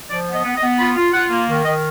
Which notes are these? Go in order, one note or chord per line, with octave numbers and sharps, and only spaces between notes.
F3 D5
B3
D#5
B3
D#5
B3
F4 B5
F4
F4 F#5
A#3
D#3
D#3 D#5